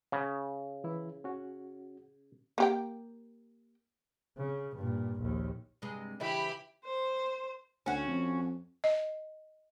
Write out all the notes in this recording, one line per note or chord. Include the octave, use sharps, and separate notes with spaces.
C#3
E3 E4
C#4 F#4
A#3 G4 G5
C#3
G2 A#2
A#1 D#2
G2 C3 G#3
C#3 E3 E4 G4 E5 B5
C5
D2 C#4 F#4
F2
D#5